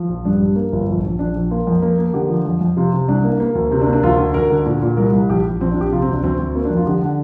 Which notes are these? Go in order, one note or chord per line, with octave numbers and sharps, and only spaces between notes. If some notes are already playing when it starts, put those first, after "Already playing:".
Already playing: F3
A#1
G2 D4
G3
A#3
G1
A#1
A#1
A#1 D4
A#1
A#3 F4
F2
A#3
A#3
D3 G4
F3
F2
F2
C3 F4
C3
C2 D4
A#3
A#3
D2
C3 C4
D4
A#3
D4
D2 F4
D3
D2 A#4
D3
A#2
A#2
C2 A#4
C2
A#1 G4
A#1
A#1 C4
D4
A#1
G4
C3 F4
C4
D2 D4
D2 C4
D2
A#3 C4
D4
F2
F4
D3 G4
D3